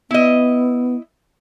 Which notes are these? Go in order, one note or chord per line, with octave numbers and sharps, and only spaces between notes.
B3 E4 D#5